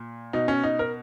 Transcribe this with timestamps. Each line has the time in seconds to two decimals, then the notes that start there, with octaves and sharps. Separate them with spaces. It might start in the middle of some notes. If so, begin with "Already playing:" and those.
Already playing: A#2
0.33 B2 D#4
0.48 C#4
0.63 D#4
0.79 A#4